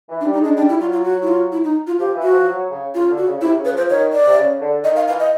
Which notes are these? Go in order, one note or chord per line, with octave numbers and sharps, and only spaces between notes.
E3
D4
G3
D#4
G#3 D4
G3 D4
E4
F#3 F4
F4
F#4
E4
F4
E4
D#4
F4
F3 G4
E3
F#4
F3
F3
F#3
C#3
C#3 F4
D3
F#4
C#3
C#3
C3 E4
C#3
B4
F3 C5
D#3 C#5
D5
C3
C#3
D3
D#3 D#5
F5
E3 F5
D#5